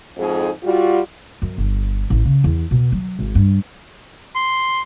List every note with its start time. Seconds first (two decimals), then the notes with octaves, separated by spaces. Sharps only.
0.17 F2 G#2 G#4
0.63 G3 F4 F#4
1.42 F#2
1.58 G1
2.10 A1
2.25 C#3
2.44 E2
2.71 B2
2.92 F#3
3.19 G#1
3.35 G2
4.35 C6